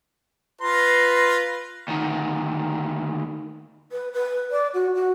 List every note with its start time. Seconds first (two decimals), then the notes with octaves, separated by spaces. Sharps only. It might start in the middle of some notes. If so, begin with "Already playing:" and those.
0.61 F4 B4 A#5 C6
1.88 D2 D#3
3.92 B4
4.13 B4
4.51 D5
4.74 F#4
4.95 F#4